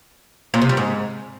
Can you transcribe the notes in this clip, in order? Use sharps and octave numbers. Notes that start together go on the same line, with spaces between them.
A#2
C3
G3
G#2